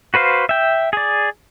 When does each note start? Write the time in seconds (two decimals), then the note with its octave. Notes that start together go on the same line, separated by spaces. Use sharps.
0.14 F#4 B4 C5 F5
0.49 E5 G5
0.93 G#4 D5